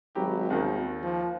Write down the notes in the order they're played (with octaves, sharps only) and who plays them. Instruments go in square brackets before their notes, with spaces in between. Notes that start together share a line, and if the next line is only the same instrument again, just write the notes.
[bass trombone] G#1 [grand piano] F#3 G3 G4
[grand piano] D#2 D#3
[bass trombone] F3